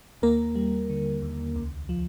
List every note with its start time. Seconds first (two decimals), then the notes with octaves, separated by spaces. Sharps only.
0.22 D#2 A#3 A#4
0.56 G3
0.90 D3
1.22 D#2
1.56 C#2
1.89 F3